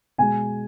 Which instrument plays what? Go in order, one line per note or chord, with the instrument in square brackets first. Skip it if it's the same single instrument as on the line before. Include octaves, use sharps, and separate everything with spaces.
[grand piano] B2 G#3 G#5